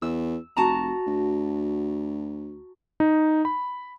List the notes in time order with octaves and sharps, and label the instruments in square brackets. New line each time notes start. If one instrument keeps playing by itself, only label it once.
[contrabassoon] E2 [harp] E6
[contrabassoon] F1 [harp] F#4 A5 A#5
[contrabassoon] D2
[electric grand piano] D#4
B5